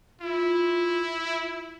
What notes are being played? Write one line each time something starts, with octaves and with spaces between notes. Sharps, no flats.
E4 F4